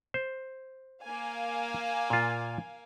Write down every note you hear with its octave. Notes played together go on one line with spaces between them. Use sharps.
C5
A#3 F5 G#5
A#2 F4